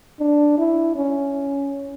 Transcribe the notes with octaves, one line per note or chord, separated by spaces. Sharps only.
D4
E4
C#4